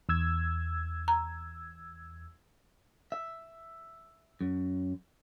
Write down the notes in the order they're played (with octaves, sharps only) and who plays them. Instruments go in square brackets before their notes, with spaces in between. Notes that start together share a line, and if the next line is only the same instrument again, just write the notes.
[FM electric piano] E2 E6 G#6
[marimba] A#5
[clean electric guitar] E5
F#2